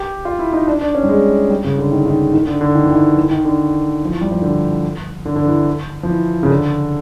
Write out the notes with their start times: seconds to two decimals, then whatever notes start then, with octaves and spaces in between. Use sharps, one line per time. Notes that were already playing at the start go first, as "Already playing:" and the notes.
Already playing: G4
0.25 F4
0.39 E4
0.53 D#4
0.67 D4
0.81 D4
0.95 C#4
1.03 G3
1.09 G#3
1.50 G3
1.64 C#3
1.79 D3
1.92 D#3
2.06 D#3
2.34 D#3
2.47 D3
2.61 D3
2.75 D#3
2.84 E3
2.91 D#3
3.17 E3
3.31 D#3
3.45 D3
4.05 F3
4.10 E3
4.21 G3
4.31 F3
4.42 D3
5.25 D3
5.36 D3
5.46 E3
6.03 F3
6.09 E3
6.43 C#3
6.50 D3